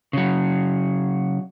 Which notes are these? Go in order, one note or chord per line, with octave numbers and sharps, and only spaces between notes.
C#3 F#3